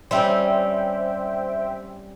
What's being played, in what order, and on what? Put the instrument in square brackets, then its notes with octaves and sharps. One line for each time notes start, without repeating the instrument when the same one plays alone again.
[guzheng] G3 C4 C#4 [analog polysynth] C5 E5 G5